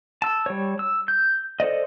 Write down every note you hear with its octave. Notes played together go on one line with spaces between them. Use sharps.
A5 E6
G3 C#5
E6
G6
A4 C5 D5 D#5